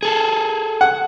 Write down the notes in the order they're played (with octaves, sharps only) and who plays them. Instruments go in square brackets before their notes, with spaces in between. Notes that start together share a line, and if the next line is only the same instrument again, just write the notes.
[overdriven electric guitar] G#4 A4
[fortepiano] F#5